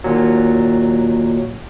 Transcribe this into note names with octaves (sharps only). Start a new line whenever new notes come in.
D#2 A#2 F#3